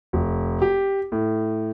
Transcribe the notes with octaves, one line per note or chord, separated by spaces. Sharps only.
F1
G4
A2